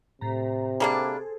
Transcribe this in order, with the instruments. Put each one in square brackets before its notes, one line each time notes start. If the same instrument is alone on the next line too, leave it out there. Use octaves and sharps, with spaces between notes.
[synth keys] A2 A#5 [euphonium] C3
[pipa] G3 A#3 D4 [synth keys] G#4 A4 C5